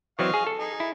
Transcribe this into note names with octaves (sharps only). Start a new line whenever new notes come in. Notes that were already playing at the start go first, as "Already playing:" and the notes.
E3 F#3 C4 D#5 F5 C#6
G#4
A4
D#4 G#4
E4